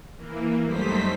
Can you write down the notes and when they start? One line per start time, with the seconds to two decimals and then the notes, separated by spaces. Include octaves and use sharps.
0.17 E3 A#3
0.63 F#2 G3 A3 D#4 C5 B6